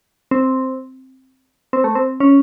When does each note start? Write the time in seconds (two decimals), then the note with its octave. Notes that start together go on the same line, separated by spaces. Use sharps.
0.31 C4
1.73 C4
1.84 A3
1.95 C4
2.20 C#4